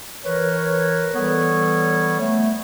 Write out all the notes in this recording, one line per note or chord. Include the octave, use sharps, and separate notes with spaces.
E3 A#4 B4 C#5
E3 G3 B3 A4 C#5
A3